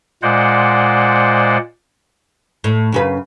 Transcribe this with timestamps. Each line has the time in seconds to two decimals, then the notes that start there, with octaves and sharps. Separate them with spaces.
0.23 A#2 G#3 C5 D5 F#5
2.64 A2
2.92 F#2 C#3 B4